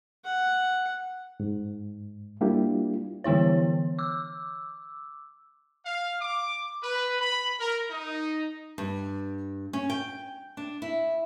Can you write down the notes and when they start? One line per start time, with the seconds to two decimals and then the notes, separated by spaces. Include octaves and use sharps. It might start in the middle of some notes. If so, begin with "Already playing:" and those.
0.24 F#5
1.40 G#2
2.41 G3 A#3 D4 E4 F4 G4
3.24 D3 E3 B3 E4 C#5
3.99 D6 E6
5.85 F5
6.21 D6
6.83 B4
7.21 B5
7.60 A#4
7.90 D#4
8.78 G2
9.73 C#4
9.90 G5
10.57 D4
10.82 E4